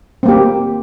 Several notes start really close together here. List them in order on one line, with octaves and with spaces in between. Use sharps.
C4 A#3 G4